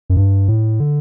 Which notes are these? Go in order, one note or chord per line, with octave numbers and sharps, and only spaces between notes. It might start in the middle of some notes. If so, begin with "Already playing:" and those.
F#2
G2
A2
D3